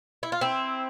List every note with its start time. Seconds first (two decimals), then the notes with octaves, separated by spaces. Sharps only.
0.23 E4
0.32 F4
0.41 C4 E4